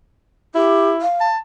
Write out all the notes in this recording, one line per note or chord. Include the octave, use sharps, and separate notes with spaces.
E4 G4
F5
A5